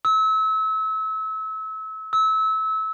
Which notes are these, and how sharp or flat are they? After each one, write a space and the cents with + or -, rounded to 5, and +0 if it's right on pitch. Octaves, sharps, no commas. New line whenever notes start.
E6 -30
E6 -25